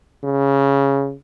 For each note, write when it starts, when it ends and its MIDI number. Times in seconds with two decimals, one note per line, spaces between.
0.24 1.14 49